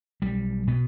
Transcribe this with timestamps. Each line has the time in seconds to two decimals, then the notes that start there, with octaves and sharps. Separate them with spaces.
0.22 B1 G3
0.67 B2 B3